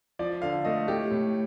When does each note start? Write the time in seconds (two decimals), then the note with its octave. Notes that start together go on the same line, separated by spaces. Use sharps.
0.19 F3 D5
0.42 D3 F5
0.65 A3 D#5
0.88 A2 G4
1.11 A2